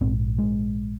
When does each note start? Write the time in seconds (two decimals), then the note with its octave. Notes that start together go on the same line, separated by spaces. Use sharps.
0.01 A#1 G#2 C4
0.38 G#3